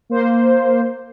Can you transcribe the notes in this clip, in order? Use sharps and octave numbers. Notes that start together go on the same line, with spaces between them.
A#3 C5